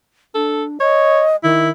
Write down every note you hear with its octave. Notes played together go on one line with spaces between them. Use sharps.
D4 A4
C#5 D#5
D#3 E4